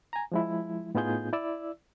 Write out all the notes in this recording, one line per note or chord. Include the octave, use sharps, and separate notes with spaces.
G#5 A#5
F3 G#3 E4
A2 B3 D#4 F4 G#4 G6
E4 D5 E6